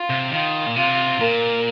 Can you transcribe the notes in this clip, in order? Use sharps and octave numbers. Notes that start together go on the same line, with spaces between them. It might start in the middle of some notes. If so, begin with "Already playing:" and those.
Already playing: F4
C3
D#3 F4
A#2
C3 F4
A#2 A#4